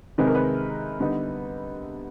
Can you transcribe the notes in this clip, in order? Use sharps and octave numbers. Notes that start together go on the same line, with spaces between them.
C3 D#3 G#3 C4 D#4 B4
A#4
B4
D3 G3 B3 D#4